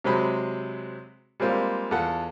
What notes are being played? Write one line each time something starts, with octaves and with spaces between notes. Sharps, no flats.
C3 F#3 G#3 C4 G#4 B5
G3 G#3 A#3 C4 F4
E2 F4 A4 F#5